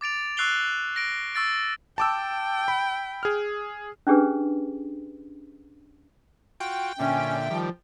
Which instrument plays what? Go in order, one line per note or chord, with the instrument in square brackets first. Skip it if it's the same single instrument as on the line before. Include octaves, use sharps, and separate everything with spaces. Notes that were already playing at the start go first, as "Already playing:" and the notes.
[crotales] D6 A6 D7 F7
C#6 E6 F#6 C7 F7 G7
A#6 D7
C#6 E6 A6 D7
[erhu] G5 [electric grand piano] A5 D6 E6
[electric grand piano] B5
G#4 F6
[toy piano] C#4 D4 G4 G#4 B4
[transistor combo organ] F4 F#4 [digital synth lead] G5
[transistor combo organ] A#2 D3 [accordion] C#4 [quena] E5
[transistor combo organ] D#3 G3 [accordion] F3